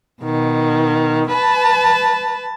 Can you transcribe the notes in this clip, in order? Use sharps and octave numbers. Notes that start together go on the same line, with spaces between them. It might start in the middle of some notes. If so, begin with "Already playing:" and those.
B2 D#3
B4 A5